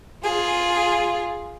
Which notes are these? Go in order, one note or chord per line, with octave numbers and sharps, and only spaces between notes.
F4 G#4